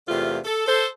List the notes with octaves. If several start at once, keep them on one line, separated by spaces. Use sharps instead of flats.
E2 C3 A3 F4
A4
A4 C5